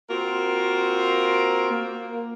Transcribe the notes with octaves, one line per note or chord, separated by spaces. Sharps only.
A#3 C4 F4 F#4 A#4
A#3